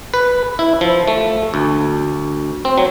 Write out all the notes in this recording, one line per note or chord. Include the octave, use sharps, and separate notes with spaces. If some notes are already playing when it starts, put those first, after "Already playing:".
B4
E4
F3
A3
D2
C4
F#3